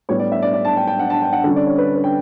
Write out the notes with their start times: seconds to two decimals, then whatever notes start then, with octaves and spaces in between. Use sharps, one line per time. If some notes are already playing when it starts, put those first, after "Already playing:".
0.09 A2 G3 B3 C#5
0.20 D5
0.32 E5
0.42 D5
0.54 D5
0.65 A5
0.77 G5
0.88 G5
1.00 F#5
1.10 A5
1.22 G5
1.33 F#5
1.44 D3 G3 C#4
1.56 D5
1.67 C#5
1.78 B4
1.95 B4
2.04 G5